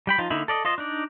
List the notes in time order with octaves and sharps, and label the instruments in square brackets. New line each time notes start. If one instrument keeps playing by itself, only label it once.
[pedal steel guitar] G3 G5 B5
F3 D#4 F4
D3 A#3 D#4 E4
A4 D5 D#5
F4 C5 D#5
D4 D#4 D5